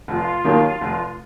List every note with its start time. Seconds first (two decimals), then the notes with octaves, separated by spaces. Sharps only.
0.08 F1 F4
0.44 D#2 D#3 F#3 A#3
0.81 F1